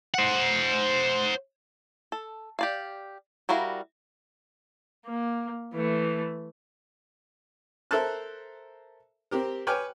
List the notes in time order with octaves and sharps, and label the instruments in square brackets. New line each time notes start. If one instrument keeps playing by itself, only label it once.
[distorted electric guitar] C5 F#5
[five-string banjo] A4
G4 D5 F5
G3 E4 F#4 A#4 F5
[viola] A#3
E3 A3
[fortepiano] A4 A#4 C5 E5 A5 F#6
C4 G4 A#4
B4 C#5 G5 G#5 D6 F6